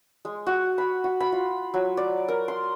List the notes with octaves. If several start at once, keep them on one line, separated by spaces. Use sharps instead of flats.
G#3
F#4
B5
F#4
B5
F4
F#3
D5
A#4
C6